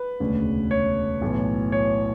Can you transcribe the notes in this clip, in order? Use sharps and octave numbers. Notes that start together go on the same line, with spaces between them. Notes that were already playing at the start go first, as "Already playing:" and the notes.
Already playing: B4
E1 D2 C#3
C#5
B1 A2 E3
C#5